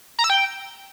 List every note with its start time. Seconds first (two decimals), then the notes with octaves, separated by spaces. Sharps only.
0.19 A#5
0.24 E6
0.30 G5